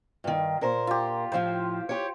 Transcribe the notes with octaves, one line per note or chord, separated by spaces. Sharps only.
G2 D#3
A#2 A#4 C5
F4 G4
A2 F3 C5 F5 G5
G4 C#5